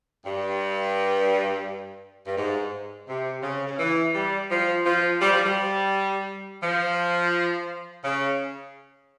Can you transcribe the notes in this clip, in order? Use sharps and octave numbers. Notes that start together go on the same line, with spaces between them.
G2
G2
G#2
C3
C#3
C#3
E3
G3
F3
F3
G3
F3
G3
F3
C#3